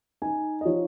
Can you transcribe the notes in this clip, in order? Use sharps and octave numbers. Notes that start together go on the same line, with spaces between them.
D#4 G#5
D#5
F3 C#5